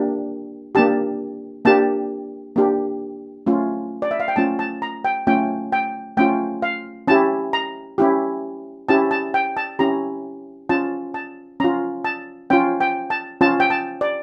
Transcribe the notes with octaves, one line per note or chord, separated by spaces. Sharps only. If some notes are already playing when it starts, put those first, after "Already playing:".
Already playing: A#3 D4 G4
A#3 D4 G4 A5
A#3 D4 G4 A5
A#3 D4 G4
A3 C#4 F4
D5
E5
F5
G5
A3 C#4 F4 A5
A5
A#5
G5
A3 C#4 F4 G5
G5
A3 C#4 F4 G5
F5
C#4 E4 G4 A5
A#5
C#4 E4 G4
C#4 E4 G4 A5
A5
G5
A5
C#4 E4 G4 A#5
C#4 F4 A5
A5
C#4 F4 A#5
A5
C#4 F4 G5
G5
A5
C#4 F4 A5
G5
A5
D5